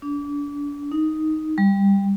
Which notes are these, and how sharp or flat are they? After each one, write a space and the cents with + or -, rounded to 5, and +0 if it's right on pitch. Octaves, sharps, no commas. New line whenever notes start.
D4 -30
D#4 +5
G3 +15